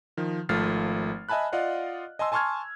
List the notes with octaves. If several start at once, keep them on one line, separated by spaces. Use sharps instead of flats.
D#3 F3
G#1 F3 A3 F6 A6 C7
D#5 E5 G#5 A5 B5 F#6
F4 D5 D#5 F5 F#5
D#5 G#5 A5 C6 E6
G#5 A5 C6 C#6 F6 G#6